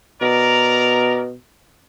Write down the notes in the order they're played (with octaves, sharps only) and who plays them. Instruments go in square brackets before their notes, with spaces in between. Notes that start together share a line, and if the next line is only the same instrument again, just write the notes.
[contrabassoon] B2 [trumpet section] A#4 D5 A#5